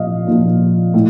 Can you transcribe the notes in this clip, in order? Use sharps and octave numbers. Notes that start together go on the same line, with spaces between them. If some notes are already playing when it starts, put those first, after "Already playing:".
Already playing: A#2 F3 D#5 F5
A#2 F3
A2